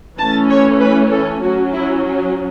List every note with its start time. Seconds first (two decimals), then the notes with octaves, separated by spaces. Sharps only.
0.18 E3 A3 C#4 A5
0.49 C#5
0.80 B4
1.11 A4
1.42 F#3 C#4 F#4
1.73 E4